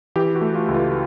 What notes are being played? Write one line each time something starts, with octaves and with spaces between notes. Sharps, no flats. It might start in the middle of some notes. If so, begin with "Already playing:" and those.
E3 G4
F#4
A3
F4
C#2
F4